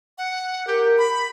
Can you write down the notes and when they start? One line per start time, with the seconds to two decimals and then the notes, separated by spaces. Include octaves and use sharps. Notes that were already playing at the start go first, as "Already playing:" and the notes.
0.18 F#5
0.67 G4 A#4
0.98 B5